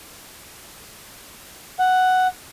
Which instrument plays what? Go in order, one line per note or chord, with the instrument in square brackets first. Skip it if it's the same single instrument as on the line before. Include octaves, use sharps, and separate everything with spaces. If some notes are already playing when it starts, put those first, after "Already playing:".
[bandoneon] F#5